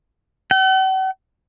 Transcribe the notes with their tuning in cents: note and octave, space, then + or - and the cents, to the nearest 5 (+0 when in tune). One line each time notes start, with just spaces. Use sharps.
F#5 +45